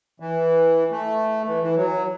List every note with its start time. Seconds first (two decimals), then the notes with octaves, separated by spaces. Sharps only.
0.20 E3
0.91 A3
1.47 E3
1.62 E3
1.77 F#3